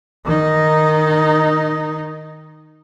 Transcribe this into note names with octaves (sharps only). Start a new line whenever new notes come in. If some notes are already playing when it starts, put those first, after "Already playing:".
D#3 D#4